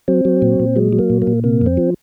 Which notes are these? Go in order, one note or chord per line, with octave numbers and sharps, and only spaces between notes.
F#3 C4
F#3
A#2
A#2
F#3 G#3
F#3
A#3
A#2
A#3
A#2
C3 A#3
F2 C4
F3